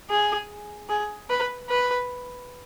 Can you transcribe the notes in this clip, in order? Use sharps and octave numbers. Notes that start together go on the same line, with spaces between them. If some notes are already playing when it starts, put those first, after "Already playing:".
G#4
G#4
B4
B4